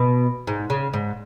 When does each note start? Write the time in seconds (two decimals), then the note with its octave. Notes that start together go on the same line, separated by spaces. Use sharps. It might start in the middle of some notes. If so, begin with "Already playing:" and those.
Already playing: B2
0.47 G#2
0.70 C#3
0.94 G#2